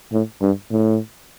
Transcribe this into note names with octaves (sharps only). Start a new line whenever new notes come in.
A2
G2
A2